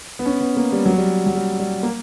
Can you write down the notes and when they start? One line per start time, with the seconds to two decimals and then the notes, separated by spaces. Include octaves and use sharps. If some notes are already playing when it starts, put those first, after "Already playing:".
0.19 B3
0.26 C#4
0.41 B3
0.57 A#3
0.72 G3
0.86 F#3
0.98 G3
1.26 F#3
1.35 G3
1.59 G3
1.83 A#3